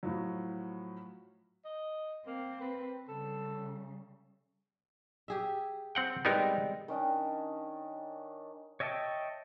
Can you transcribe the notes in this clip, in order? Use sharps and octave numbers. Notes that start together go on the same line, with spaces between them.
A2 F3 F#3
D#5
A#3 C4
B4
C#3 G3 A4
G4 G#4 E5
C4 F#5 G5
G3 G#3 B3 C4 D#4 A#4
D#3 C#4 D4 D#5
C#5 D#5 E5 G5 A5